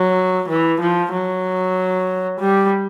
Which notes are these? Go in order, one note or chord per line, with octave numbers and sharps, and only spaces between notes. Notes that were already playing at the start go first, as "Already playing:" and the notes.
Already playing: F#3
E3
F3
F#3
G3